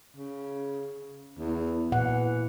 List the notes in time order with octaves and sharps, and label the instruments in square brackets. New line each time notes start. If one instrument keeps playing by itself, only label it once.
[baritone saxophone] C#3
E2
[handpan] A#2 F#5 [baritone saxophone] E3